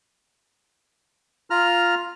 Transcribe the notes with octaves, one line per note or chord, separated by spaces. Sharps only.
F4 A#5 F6